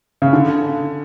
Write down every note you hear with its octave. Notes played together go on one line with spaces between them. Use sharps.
C#3
D3